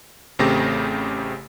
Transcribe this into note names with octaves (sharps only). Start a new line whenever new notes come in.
A1 C#3 A3 C4 G4 A#6